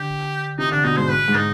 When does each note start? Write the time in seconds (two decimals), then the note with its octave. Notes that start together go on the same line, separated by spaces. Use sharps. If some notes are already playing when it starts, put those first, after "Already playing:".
Already playing: D3 G4
0.58 C3 D#4
0.71 D3 D4
0.84 B2 D#4
0.97 G#2 C5
1.10 B4
1.28 G#2 D4
1.36 D#4